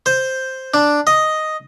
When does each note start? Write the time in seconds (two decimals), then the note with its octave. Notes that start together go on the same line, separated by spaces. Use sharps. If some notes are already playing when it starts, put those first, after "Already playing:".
0.06 C5
0.74 D4
1.07 D#5